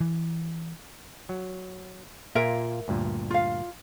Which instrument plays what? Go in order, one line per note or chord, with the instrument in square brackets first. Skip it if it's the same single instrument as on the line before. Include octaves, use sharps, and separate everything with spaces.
[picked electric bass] E3
[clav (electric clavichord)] F#3
[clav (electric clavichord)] A#2 A#3 F4 [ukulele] A#4 E5
[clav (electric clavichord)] D2 G2 A#2
[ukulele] F4 F5